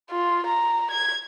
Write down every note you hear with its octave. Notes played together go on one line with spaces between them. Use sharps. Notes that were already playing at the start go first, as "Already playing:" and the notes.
F4
A#5
G#6